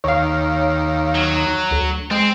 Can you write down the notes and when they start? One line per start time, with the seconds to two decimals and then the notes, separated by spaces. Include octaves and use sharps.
0.04 D#2 C#5 F5
1.15 F#3
1.71 D2
2.11 G#3 C4